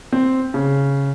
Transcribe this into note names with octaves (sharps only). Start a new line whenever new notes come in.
C4
C#3